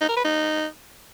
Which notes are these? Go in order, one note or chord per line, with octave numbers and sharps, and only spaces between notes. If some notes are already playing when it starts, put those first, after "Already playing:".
D#4
A#4
B4
D#4